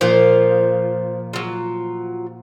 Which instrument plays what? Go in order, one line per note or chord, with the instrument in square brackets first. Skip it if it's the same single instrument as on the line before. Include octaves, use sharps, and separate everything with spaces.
[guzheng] A#2 F3 [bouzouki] C5 F5
[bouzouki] F#3 F4